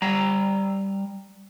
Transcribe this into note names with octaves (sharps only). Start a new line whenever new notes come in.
G3 A#5